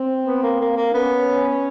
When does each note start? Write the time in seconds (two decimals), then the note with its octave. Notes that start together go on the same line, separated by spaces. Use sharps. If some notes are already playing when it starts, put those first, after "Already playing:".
Already playing: C4
0.26 B3
0.43 A#3
0.61 A#3
0.77 A#3
0.93 B3 C#4